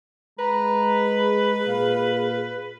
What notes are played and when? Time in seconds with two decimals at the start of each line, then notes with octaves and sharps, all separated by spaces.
0.39 G#3 B4 A#5
1.06 G#4 B5
1.67 A#2 F5